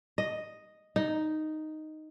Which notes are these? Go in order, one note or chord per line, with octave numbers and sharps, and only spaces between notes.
D#5
D#4